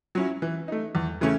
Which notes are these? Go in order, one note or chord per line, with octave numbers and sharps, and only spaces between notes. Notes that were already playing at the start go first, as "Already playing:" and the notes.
F#3 C#4 E4
E3
A3 D#4
E2
C#3 E3 A3 C#4